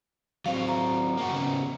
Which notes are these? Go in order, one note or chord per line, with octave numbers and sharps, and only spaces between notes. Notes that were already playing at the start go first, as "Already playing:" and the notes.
F#3 C4 F5
A#5
A#3 F#4
C#3 B3